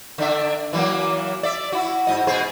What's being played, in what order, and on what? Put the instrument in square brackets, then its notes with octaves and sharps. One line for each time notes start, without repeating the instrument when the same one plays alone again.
[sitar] D3 D4 E5
E3 F#3 A#3
D5 E5
E4 F#4
G#2 D#5
B2 G#4 C5